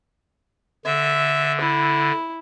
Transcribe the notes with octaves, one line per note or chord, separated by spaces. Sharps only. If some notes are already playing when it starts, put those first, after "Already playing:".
D3 E5
E4